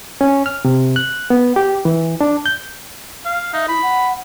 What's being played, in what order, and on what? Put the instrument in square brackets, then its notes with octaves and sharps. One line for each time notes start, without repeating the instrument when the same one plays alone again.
[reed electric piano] C#4
F6
C3
F#6
B3
G4
E3
D4
G6
[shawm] F5
[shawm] D#4 [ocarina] E5
[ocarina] E4 [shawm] B5
[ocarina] F#5